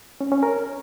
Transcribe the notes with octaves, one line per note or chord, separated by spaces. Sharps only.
C#4
C#4
A#4